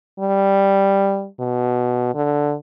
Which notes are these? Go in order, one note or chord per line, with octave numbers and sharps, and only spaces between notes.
G3
B2
D3